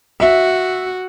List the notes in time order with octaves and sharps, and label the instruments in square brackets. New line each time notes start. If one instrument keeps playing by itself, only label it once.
[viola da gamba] F#4 [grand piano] E5